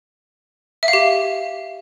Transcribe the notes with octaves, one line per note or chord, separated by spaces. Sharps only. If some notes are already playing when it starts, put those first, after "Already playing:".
E5
F5
G4